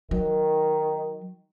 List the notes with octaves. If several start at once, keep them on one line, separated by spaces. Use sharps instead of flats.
D#3 F#3